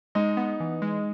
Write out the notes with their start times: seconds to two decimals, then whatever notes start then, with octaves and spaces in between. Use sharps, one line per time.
0.15 G#3 D#4
0.37 B3
0.60 E3
0.82 G#3